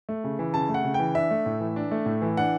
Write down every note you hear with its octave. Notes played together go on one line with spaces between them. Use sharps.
A3
C#3
E3
C#3 A5
A3
F#5
C#3
G5
E3
D4 E5
A3
A2
E3
D4
A3
A2
E3
D4 F#5